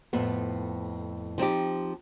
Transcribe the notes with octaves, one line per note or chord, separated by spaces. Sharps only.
F2 A2 B3
F3 C4 D#4 G4